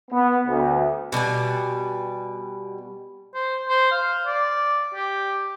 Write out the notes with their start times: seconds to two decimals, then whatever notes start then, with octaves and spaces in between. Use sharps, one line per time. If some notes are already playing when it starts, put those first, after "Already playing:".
0.10 B3
0.46 D2
1.12 B2 G3 B4 G#5
3.35 C5
3.69 C5
3.91 F5
4.26 D5
4.95 G4